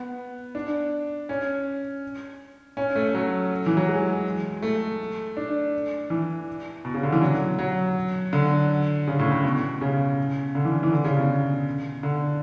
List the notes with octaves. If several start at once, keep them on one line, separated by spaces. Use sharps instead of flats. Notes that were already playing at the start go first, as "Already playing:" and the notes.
Already playing: B3
D4
C#4
C#4
A3
F#3
E3
F#3
G#3
A3
D4
E3
B2
C#3
D3
E3
F#3
F#3
D3
C#3
A2
A2
B2
C#3
D3
E3
E3
D3
C#3
B2
D3